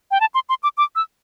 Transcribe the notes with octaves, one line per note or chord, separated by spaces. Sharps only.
G5
A5
C6
C6
D6
D6
E6